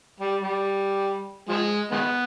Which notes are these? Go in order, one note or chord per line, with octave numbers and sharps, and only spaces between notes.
G3
G3
F3 G#3
D#3 G#3 B3